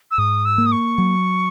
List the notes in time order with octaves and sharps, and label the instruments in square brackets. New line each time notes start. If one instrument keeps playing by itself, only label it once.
[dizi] E6
[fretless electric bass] G#2 [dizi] D#6
[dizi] E6
[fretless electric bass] A#3
[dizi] D#6
C#6
[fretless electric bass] F#3